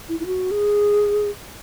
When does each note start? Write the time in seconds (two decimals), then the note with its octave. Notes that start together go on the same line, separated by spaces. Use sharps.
0.09 E4
0.20 E4
0.26 F#4
0.51 G#4